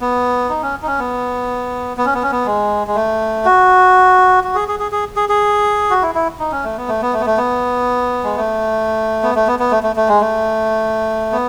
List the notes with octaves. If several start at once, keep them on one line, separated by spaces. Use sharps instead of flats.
B3
D#4
C#4
D#4
C#4
B3
B3
C#4
B3
C#4
B3
G#3
G#3
A3
F#4
F#4
G#4
G#4
G#4
G#4
G#4
G#4
F#4
E4
E4
D#4
C#4
A3
B3
A3
B3
A3
B3
A3
B3
G#3
A3
B3
A3
B3
B3
A3
A3
A3
G#3
A3
B3